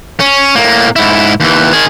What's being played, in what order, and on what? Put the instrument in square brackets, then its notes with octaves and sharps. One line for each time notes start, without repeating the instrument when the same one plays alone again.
[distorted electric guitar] C#4
A2 A#3
G#2 E4
D#2 E3
D#3 G#4